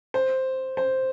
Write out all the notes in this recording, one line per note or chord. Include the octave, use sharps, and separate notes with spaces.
C5
C5